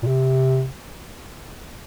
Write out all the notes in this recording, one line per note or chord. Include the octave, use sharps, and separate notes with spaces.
A#2
C3